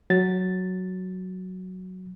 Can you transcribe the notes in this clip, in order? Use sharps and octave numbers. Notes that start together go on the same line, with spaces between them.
F#3 A6